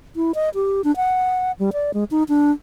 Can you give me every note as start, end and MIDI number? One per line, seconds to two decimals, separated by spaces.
0.16 0.32 64
0.35 0.49 75
0.55 0.82 67
0.84 0.95 62
0.96 1.52 78
1.59 1.70 55
1.73 1.91 74
1.94 2.04 56
2.11 2.23 63
2.29 2.52 62